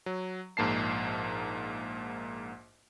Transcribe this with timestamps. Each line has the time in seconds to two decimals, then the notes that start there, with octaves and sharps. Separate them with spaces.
0.06 F#3
0.57 A#1 G#2 A#3 A5 C7